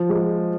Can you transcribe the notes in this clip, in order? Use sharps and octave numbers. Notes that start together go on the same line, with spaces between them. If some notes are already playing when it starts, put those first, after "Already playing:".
Already playing: F3
G#3